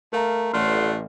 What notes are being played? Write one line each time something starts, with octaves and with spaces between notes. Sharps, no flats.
A3 A#4 F5 A#5
A1 A3 D5 F#5 C6 F6